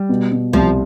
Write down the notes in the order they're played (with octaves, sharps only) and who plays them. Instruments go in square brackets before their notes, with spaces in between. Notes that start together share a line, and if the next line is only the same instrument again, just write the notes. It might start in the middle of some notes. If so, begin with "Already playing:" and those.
Already playing: [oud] G3
[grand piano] B2
B2
[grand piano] C2 [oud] F3